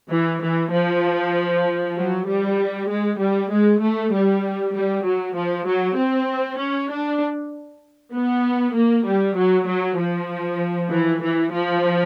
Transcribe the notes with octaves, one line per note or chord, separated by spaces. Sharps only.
E3
E3
F3
F#3
G3
G#3
G3
G#3
A3
G3
G3
F#3
F3
F#3
C4
C#4
D4
B3
A#3
G3
F#3
F#3
F3
E3
E3
F3